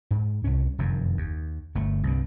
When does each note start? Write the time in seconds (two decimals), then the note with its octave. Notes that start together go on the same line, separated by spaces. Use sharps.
0.11 G#2
0.44 C2 C#4
0.78 F1 F#2 D#3
1.17 D#2
1.75 G1 A3
2.03 C2 G2